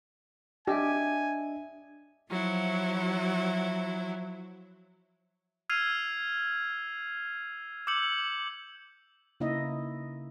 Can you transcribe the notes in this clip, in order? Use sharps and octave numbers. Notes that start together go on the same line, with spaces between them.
D4 G4 D#5 E5 G#5
F3 F#3 E4
E6 F6 G#6 C7 D#7 F7
D6 E6 G6 C#7 F#7
C#3 A#3 D#4 E4 D#5 E5